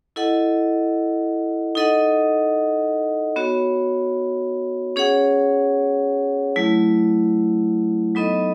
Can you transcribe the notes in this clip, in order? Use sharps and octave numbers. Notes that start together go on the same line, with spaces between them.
E4 A4 D#5 F#5
D#4 A4 D#5 F#5
B3 F#4 C#5
C#4 G#4 C#5 F#5
F#3 A3 E4
F#3 B3 D#4 A4 D#5